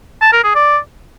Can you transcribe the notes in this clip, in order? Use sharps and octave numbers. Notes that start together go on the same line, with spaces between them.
A5
A#4
G#4
D5